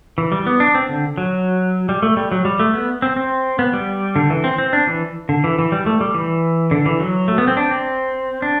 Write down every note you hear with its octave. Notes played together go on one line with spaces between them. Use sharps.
E3
G3
B3
D4
C4
D3
F#3
G3
A3
G3
F#3
G3
A3
B3
C4
C4
B3
G3
D3
E3
C4
C4
D4
E3
D3
E3
E3
G3
A3
G3
E3
D3
E3
F#3
A3
B3
C4
D4
C4
D4